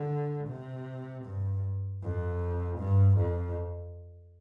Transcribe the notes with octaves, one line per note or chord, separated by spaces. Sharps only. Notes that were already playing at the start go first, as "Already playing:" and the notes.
Already playing: D3
C3
G2
F2
G2
F2